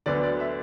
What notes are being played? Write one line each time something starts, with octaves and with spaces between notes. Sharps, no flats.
D2 D3 F#3 B3 D4 D5
D5
E5